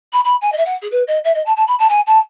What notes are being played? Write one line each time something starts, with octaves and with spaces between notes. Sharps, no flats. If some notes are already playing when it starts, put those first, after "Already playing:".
B5
B5
G#5
D#5
E5
F#5
G#4
B4
D#5
E5
D#5
A5
A5
B5
A5
G#5
A5